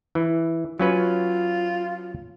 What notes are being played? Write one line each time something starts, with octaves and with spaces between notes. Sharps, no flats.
E3
F#3 C#4 F4 B4